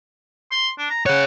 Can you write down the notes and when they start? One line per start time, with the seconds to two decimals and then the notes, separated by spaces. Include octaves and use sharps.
0.52 C6
0.79 D4
0.90 A#5
1.06 G#4 C#5 F#5